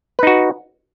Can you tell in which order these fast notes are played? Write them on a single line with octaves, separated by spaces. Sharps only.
B4 D#4 F#4